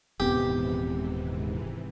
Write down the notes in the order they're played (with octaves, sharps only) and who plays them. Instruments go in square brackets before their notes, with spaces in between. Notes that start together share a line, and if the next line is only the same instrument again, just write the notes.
[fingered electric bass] D#1 B3 C4 [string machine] G#2 C3 E3 [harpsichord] G4